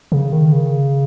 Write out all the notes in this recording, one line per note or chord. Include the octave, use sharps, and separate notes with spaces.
C#3
D#3
C#3